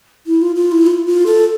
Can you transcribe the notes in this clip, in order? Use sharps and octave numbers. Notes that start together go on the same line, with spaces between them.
E4
F4
F4
E4
F4
F4
A4